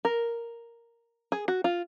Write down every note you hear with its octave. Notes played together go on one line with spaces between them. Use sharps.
A#4
G#4
F#4
F4